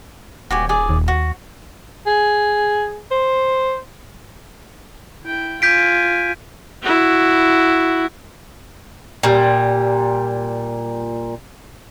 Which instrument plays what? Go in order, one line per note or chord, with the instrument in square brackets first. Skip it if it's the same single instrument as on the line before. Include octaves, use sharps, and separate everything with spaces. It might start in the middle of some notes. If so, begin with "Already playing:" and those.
[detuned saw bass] D#1 [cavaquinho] F#4 G4 G#5
[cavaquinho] G#4 D5 G#5
[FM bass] D#2
[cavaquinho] F#4
[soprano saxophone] G#4
C5
[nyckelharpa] E4 G5
[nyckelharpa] F4 G#5 [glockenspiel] G6 B6 D7
[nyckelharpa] E4 F#4
[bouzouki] A#2 G3